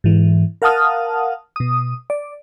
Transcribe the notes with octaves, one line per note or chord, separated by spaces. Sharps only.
G#2 E3
A#4 F5 F#5 A5 D#6 F6
B2 D#6
D5